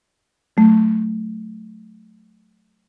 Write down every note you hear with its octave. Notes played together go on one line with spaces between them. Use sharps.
F#3 A3